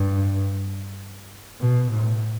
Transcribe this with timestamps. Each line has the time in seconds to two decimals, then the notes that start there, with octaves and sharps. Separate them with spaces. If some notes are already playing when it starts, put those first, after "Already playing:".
Already playing: G2
1.61 B2
1.91 A2